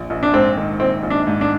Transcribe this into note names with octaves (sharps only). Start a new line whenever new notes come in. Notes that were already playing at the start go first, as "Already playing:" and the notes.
Already playing: A#1
A#1
D4
G#2 C4
D#3
A#1 C4
A#1
D4
G#2
D4